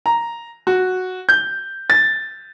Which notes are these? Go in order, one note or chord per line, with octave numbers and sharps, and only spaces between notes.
A#5
F#4
G6
A6